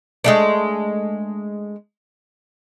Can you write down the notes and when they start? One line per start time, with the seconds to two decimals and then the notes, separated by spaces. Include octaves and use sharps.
0.24 G#3 A3 D4